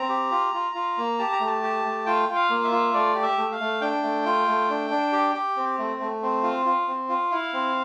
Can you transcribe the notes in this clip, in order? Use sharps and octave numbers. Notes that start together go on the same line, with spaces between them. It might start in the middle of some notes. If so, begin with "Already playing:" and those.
Already playing: C4 A#5
G4
F4
F4
F4
A#3
G4 A5
A#5
A3
A5
G4
A3
F4 G5
F4
F5
A#3
E5
F4
A3 D5
G4
E5
A3
F5
A3
D4 G5
A3
F4
A3
D4
D4
G4
G4
C4
A3
A3
C4
F4
F4
C4
F4
E4 F5
C4